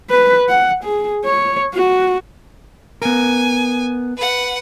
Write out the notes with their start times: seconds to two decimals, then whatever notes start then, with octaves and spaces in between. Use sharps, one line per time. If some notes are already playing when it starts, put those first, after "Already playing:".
0.10 B4
0.49 F#5
0.84 G#4
1.25 C#5
1.73 F#4
3.02 B3 A#4 G#5
4.17 B4 F#5